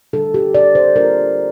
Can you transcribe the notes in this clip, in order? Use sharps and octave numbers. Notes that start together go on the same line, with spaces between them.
D3 G3 D4 A4
G4
D5
C5
G3 A#3 D4 F4 A#4